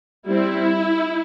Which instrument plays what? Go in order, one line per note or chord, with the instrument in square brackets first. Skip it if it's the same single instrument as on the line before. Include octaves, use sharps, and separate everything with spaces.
[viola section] G3 C4 E4